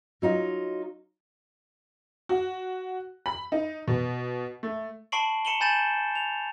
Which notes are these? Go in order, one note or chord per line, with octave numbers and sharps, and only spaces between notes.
F#3 D#4 F4
F#4
B5
D#4
B2
A3
A5 B5 C#6 C7 D7 F#7
A#5 C#7 D#7 E7 F#7 G7
G#5 B5 G6 A6 D#7 E7
F7